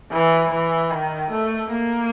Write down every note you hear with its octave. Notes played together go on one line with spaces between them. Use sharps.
E3
E3
D#3
A3
A#3